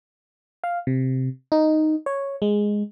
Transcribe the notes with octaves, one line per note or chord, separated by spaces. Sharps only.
F5
C3
D#4
C#5
G#3